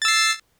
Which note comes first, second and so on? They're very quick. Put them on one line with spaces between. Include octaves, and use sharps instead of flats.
A6 E6 C7